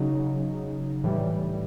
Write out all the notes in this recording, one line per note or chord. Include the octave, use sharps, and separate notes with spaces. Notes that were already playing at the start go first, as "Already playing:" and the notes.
Already playing: C#3 F#3 D#4
A2 E3 G3